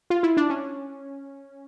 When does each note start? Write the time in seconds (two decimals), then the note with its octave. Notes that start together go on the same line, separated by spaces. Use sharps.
0.10 F4
0.23 E4
0.37 D4
0.50 C#4